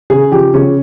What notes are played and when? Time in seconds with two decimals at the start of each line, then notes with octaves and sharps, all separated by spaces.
0.10 C#3 G#4
0.32 F3 G4
0.54 C#3 C#4